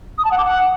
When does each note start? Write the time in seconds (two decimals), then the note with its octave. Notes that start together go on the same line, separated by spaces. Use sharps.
0.18 D#6
0.25 A5
0.31 F#5
0.38 D6
0.45 F#5